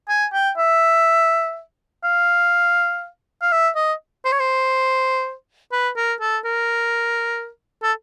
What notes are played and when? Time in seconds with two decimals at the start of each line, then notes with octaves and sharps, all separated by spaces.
0.09 G#5
0.33 G5
0.57 E5
2.04 F5
3.42 F5
3.52 E5
3.76 D#5
4.25 C5
4.32 C#5
4.40 C5
5.72 B4
5.96 A#4
6.21 A4
6.45 A#4
7.83 A4